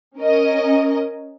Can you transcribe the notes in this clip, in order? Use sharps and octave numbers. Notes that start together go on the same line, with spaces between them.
C#4 A#4 D#5